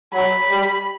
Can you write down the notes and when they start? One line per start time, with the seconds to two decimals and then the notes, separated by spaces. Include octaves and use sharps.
0.13 F#3 B5
0.50 G3